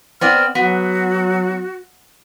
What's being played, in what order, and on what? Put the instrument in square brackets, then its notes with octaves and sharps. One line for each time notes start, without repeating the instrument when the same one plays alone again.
[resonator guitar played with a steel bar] B3 C4 D5 [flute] F6
[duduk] F#3 [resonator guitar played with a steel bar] B3 [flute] F#4